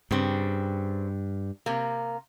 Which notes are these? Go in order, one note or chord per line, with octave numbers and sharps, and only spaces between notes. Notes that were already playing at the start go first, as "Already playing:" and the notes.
G2 C#3 C4
C3 A#3